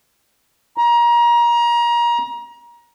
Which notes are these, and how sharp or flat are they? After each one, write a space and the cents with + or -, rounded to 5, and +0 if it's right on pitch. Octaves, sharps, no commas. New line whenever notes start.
A#5 +30